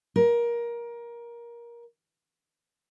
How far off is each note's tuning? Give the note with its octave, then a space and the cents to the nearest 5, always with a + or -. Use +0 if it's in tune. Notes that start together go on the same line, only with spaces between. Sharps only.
A#4 +20